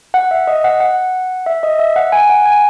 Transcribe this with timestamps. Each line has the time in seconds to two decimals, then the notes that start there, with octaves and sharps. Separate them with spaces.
0.14 F#5
0.31 E5
0.47 D#5
0.64 F#5
0.80 F#5
1.46 E5
1.63 D#5
1.79 E5
1.96 F#5
2.12 G#5
2.29 F#5
2.46 G#5